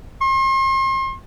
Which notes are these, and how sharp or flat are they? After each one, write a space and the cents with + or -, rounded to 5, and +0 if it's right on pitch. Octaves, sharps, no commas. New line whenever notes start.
C6 +40